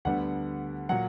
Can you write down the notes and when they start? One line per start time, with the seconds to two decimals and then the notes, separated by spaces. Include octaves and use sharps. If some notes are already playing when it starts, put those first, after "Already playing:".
0.05 D2 D3 G3 B3 F#5
0.89 A#2 F#3 F#5